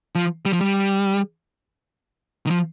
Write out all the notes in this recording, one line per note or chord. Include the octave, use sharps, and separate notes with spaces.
F3
G3
F3
G3
D#3
F3